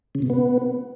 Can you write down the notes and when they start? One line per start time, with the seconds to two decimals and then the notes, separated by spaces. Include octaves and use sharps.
0.15 C#3
0.22 B2
0.30 B3